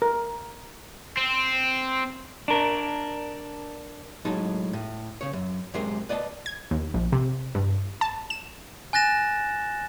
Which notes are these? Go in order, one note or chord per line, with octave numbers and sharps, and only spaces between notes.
A#4
C4
D4 A#4
A2 F#3 G#3 D#4 A5
A2
C#3 C#5
F#2
F#2 C3 G#3 A#4 C5
B4 D5 D#5 G#5 A5
G#6
D#2
A#1
C3
G2
A5
E7
G#5 F#6 A6 A#6 E7